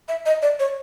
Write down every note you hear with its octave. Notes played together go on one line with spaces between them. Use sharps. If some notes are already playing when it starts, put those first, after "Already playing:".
E5
D#5
D5
C#5